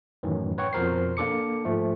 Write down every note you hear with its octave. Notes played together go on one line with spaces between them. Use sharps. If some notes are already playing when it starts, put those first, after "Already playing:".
F#2 A2 D#3 E3 F#3
B4 C#5 F#5 G5 C#6
F2 B2 F3 A#4 C5 C7
A#3 D4 A4 D6 C#7
G#2 F3 A3